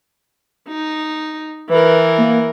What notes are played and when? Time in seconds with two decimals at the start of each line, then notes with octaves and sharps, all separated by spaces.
0.69 D#4
1.70 E3 A#4 B4
2.18 A#3